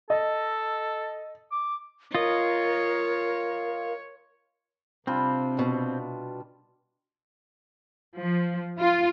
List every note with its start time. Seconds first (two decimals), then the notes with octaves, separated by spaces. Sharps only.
0.10 A4 D#5
1.52 D6
2.15 F4 A#4 C#5 D#5
5.07 C3 G3 C4 D4 F4
5.59 B2
8.17 F3
8.78 F4